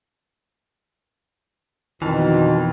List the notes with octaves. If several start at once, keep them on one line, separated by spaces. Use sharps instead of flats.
F2 B2 D#3 E3